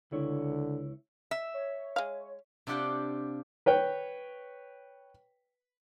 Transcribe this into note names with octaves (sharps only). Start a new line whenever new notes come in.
C#2 D3 E4 C#5
E5
C#5
G#3 F5
C3 D4 F4 G4 F#5 G5
B4 C#5 G5